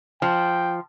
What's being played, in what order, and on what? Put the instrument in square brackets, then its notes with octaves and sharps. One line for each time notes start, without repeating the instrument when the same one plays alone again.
[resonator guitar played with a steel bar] F3 [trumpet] G5